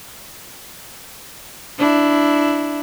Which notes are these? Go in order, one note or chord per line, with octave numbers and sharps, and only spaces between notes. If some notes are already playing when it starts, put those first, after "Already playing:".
D4 E4